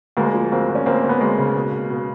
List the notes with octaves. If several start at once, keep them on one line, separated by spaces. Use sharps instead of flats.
D2 G#3 A#3
F3
D2 A#3 C4
D2
C#4
D2 A#3 C4
D2
B3
D2 G#3 A#3
C#3
B2
B2
B2